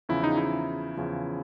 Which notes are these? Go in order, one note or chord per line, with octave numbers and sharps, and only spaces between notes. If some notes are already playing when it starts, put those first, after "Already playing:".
E2 C#3 F3 E4
D#4
E4
E2 C#3 F3